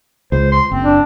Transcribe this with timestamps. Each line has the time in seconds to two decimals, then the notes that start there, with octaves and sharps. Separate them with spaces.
0.32 C#2 C5
0.52 C6
0.71 F#1 C4
0.85 D4